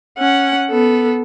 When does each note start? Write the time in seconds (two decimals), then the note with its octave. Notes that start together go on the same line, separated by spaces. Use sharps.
0.19 C#4 F#5
0.70 B3 A4